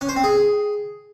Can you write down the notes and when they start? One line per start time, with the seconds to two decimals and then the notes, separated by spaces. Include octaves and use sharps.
0.01 C#4
0.09 C5
0.16 C4
0.24 G#4